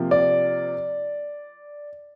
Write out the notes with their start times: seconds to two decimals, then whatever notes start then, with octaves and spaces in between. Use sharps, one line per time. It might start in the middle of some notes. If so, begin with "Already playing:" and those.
Already playing: C3 F3 A#3
0.11 D5